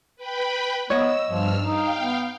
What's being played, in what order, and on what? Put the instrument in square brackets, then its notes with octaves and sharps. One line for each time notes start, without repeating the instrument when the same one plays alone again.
[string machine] B4 G5 B5
[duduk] B3 [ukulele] C#5 D#5 [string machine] E6
[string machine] G2 E6 F6 [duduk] F3
[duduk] D#4 [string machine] F5 G5
[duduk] B3